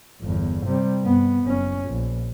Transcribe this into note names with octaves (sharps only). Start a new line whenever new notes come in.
G1 E2
C3 G3
G2 B3
F#1 C#4
A#1